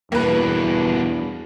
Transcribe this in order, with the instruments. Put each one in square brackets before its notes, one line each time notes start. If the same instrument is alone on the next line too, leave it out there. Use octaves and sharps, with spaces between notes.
[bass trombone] E2 [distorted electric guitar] G2 B2 [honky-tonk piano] A#3 B4